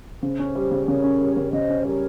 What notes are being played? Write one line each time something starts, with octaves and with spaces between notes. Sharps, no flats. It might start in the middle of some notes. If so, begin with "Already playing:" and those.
C#3 C5
C#4
G3
C#3
C#3 A#4 C#5
C#4
G3
C#3
C#3 C5 D#5
C#4
G3 A#4 C#5